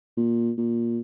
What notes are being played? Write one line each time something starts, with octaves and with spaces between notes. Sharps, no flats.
A#2
A#2